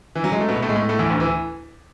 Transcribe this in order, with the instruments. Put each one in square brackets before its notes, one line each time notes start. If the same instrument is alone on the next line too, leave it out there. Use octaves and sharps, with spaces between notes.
[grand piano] E3
F#3
G#3
A3
B2 B3
A2 A3
G#3
A2 A3
A2 A3
E2 E3
D2 D3
E3